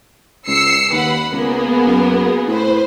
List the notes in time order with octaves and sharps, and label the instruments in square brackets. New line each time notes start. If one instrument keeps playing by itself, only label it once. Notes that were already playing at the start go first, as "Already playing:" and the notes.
[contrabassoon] C#2 [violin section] E6 C7 C#7
[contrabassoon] D#2 [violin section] B4 F#5 B5
[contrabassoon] C#2 [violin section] A#3 B3 G#4
[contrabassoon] F#2
[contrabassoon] A2 [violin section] B4 C5